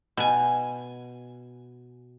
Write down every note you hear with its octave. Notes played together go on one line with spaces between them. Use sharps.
B2 G#5